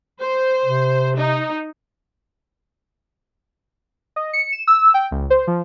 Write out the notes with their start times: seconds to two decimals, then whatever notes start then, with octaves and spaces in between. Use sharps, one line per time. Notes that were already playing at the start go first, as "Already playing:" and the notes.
0.22 C5
0.65 C3
1.18 D#4
4.16 D#5
4.33 C#7
4.52 E7
4.67 E6
4.94 G5
5.11 C#2
5.30 C5
5.47 F3